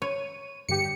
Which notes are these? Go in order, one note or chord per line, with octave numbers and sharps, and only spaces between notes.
C#5 D#7
G2 D3 G4 C#7